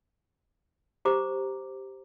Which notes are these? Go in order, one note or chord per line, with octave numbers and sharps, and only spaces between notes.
G4 C5 A#5 D6